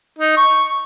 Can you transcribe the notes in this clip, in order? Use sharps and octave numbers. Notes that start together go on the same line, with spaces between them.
D#4
C#6